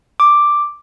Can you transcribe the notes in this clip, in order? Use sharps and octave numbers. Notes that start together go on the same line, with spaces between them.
D6